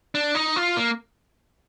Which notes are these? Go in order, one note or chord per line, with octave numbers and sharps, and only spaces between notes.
D4
D#4
F4
A#3